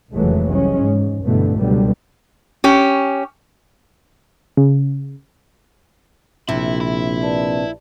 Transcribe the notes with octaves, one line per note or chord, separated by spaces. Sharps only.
F1 C#2 E3 F#3 G#3 A3
C2 G#3 C#4
G#2
G2 B2 D3 E3 A3
C#2 B2 D3 F#3 G3
C#4 G4
C#3
A#1 C3 E4
E4
B4 D5 A5